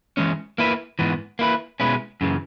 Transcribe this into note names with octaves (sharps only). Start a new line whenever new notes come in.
E3 G#3 C#4
A#3 E4 B4 E5
G#2 E3 B3
A#3 E4 B4
B2 G#3 C#4 E4 B4
F#2 C#3 E3